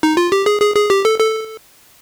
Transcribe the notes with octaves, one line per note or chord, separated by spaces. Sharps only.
D#4
F4
G4
G#4
G#4
G#4
G4
A4
A4